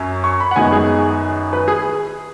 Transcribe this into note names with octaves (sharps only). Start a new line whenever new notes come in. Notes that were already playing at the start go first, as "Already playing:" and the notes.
Already playing: F#2 F#3 C#4
C#6
B5
F#5
F#2 D#3 G#3 B3 D#4 G#5
G#4
B4
G#4